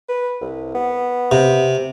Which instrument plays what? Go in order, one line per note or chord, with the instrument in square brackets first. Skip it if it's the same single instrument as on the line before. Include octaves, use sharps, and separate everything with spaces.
[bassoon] B4
C2
B3
[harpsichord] C3